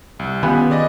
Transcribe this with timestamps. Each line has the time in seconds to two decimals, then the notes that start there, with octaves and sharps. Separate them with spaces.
0.19 C2
0.43 D#3 B3 C#4 F4 G4 G#5
0.70 G#4 D5 D#5